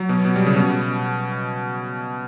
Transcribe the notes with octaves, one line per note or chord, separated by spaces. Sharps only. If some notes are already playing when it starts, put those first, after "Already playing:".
Already playing: F#3
B2
B2
G3
C#3
B2